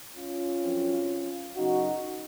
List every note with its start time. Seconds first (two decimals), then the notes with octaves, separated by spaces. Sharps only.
0.15 C#4 F4
0.62 F#2 F3 C4
1.57 F#2 C#3 F#3 D#4 F#4